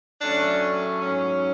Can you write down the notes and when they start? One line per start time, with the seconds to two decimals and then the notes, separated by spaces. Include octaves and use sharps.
0.20 A2 F#3 A3 C#4 D4
0.98 G#2 F#3 C#4